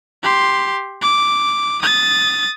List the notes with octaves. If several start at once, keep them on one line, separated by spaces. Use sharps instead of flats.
G4 C6
D6
D#6 A6